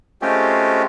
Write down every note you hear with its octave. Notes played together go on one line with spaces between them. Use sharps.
G#3 A3 C4 C#4 F4 G4